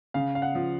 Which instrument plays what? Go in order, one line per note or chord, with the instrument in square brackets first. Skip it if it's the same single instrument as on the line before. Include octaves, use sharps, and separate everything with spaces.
[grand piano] C#3 F5
F5
F#5
F3